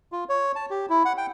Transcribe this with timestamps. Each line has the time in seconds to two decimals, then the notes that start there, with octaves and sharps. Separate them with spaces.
0.12 F4
0.29 C#5
0.56 A5
0.70 G4
0.90 E4
1.05 F#5
1.17 G5